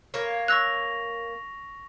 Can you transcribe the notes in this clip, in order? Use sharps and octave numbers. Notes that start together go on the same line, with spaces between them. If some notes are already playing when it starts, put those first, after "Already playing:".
A#3 C#5
C#6 E6 F#6 A#6 F7